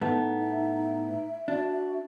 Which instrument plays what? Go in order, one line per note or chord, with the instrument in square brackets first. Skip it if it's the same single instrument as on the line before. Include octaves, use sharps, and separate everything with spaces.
[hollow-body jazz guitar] A2 A3 B3 [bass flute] D#4
[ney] E5
[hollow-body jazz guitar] D4 [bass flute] F#4